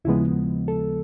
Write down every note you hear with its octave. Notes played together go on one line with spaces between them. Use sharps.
D#2 C#3 F3 G#3 B3 E4
A4